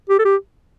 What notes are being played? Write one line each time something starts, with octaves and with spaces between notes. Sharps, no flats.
G4
A4
G4